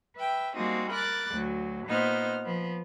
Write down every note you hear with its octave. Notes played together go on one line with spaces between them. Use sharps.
B4 E5 G5
G3 G#3 A#3 C4 D#4 F#4
A#4 B5 D6 F#6 A6
D2 F#3
A#2 B3 D#4 C5 F6
F3 B3